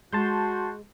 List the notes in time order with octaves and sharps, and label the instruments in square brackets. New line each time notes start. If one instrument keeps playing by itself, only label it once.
[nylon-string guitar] G#3 [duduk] F#4 [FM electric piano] A5 C6 G6